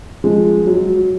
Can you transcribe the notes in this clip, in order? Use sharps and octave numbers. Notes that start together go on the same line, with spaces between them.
F3 G#3
F#3